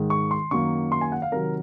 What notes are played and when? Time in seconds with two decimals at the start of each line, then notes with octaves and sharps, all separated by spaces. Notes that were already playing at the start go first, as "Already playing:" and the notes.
Already playing: G#2 D#3 G#3
0.10 C#6
0.31 C6
0.51 F#2 D#3 F#3 A#3 C#6
0.92 C6
1.01 G#5
1.12 F#5
1.22 F5
1.32 C3 D#3 F#3 A#4